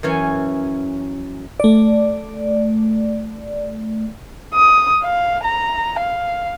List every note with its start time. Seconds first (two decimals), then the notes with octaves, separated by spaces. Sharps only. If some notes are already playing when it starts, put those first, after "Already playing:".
0.03 F#2 E3 C#4 G#5
1.60 A3 D5
4.54 D#6
5.03 F5
5.44 A#5
6.00 F5